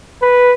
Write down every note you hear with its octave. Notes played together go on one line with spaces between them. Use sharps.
B4